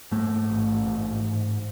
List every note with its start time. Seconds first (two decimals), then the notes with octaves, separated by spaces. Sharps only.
0.11 G#2 A3
0.50 A1
0.87 G#2